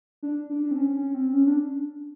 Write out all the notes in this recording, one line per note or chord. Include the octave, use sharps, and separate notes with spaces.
D4
D4
D4
C4
C#4
C#4
C4
C#4
D4